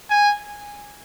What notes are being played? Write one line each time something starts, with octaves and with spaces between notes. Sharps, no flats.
G#5